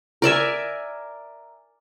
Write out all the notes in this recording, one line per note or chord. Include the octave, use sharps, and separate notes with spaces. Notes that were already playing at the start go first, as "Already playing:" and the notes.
A#4 D5 E5 G#5